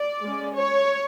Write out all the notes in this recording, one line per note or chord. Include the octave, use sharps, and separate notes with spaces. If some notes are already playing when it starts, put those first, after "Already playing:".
Already playing: D5
G#3 C#4
C#5